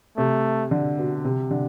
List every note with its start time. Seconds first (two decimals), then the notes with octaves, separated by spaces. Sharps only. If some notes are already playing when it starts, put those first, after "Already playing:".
0.17 C3 A3
0.71 D3
0.98 B2
1.24 C3
1.51 D3